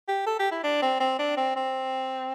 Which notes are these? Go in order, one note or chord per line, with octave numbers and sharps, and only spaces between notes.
G4
A4
G4
E4
D4
C4
C4
D4
C4
C4